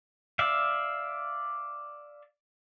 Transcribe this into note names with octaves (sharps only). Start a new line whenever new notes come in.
D5 E5 F5